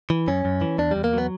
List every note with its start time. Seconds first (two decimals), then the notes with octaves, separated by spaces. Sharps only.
0.10 E3
0.28 F#2 C#4
0.45 F#2
0.61 E3
0.79 E2 D4
0.91 E2 G3
1.04 A#3
1.13 F#3 B3